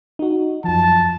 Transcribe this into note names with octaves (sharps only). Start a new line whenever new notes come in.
D#4 F#4
F#2 F3 A5